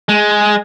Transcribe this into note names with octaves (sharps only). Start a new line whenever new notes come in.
G#3